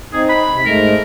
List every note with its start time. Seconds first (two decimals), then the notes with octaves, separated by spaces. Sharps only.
0.13 C4 D#4 G#4
0.29 B5
0.52 C3
0.66 G#2 G#3 A3 A#4